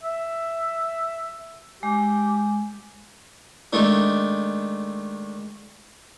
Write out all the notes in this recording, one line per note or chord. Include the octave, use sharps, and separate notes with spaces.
E5
G#3 G4
D#3 G#3 A3 D4